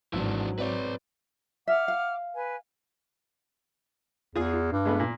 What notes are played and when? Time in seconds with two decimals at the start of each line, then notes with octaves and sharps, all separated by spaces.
0.13 G#1 G#2 E3 F#3 D4
0.58 C4 B4 C#5 D5
1.68 E5 F#5 D6 F6
1.88 F5
2.33 B4 G#5
4.36 E2 F4 G#4
4.53 F4
4.72 G2
4.86 G#3 A3 B3
5.00 A#2